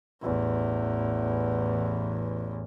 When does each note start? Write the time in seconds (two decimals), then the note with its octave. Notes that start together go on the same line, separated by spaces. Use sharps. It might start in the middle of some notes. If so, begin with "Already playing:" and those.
0.22 A1 E2